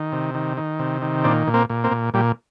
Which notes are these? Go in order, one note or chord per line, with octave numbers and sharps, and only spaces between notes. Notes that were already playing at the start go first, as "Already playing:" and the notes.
Already playing: D#3
C3
D#3
D#3
C3
D#3
A#2 C4 D4
A#2
A#3 C4
A#2
A#3 C4
A#2
A#2 G3